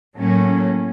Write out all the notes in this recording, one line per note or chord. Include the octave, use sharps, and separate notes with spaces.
A2 F#3 A#3 C#4